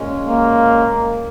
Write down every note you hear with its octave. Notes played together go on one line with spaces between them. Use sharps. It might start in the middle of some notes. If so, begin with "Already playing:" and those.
Already playing: A#2 G#3 C#4
A#3